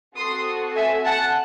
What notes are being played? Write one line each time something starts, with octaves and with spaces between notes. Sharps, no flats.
C4 F#4 A4 C6 D#6
E5 G#5
F#5 A5